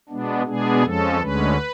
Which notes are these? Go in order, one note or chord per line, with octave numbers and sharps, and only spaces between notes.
B2 G#3 B3 D4
B2 G#3 B3 D4 G#4
F2 F3 G#3 C#4 A4
D2 D3 G#3 C#4 B4